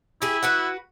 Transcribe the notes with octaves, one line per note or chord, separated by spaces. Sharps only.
E4 G4 G#4
F#4 B4 F#5